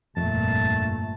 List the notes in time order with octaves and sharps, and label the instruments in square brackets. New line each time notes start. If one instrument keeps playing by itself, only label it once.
[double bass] G1 A#2 [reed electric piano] F2 [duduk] A3 [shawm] A5